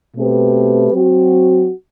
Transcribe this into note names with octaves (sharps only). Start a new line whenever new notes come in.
B2 A3 C4 G4 B4
F#3 C4 F#4